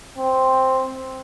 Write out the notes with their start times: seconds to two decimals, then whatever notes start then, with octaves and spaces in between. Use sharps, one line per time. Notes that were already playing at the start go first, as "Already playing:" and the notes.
0.17 C4